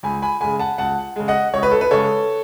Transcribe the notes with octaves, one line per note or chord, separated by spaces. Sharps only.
C#2 G#5 B5
G#5 B5
C#3 G#3 G#5 B5
F#5 A5
C#2 F#5 A5
C#3 G#3
D#5 F#5
C#2 C#5
B4
A4
B4
C#3 G#3 A4 C#5